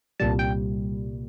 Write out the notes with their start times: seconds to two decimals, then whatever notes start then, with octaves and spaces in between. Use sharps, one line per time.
0.20 C2 A#2 G3 A5
0.39 G5